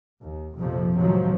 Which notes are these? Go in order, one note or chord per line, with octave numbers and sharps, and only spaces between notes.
D#2
A#1 F2 C3 F3
C#2 A2 C3 D#3 F3 F#3